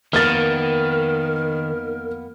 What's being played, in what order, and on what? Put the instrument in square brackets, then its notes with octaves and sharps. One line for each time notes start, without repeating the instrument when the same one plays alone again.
[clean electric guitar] F2 A#3 B3 [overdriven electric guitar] D#3 [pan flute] A#4 [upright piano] F6 A6